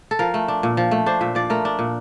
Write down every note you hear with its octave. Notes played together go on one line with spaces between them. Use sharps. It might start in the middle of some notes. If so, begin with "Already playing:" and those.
A4
F3 A#4
A3
D4
A#2
F3
A3
D4 C5
A#2 E5
F3 D5
A3 A#4
D4
A#2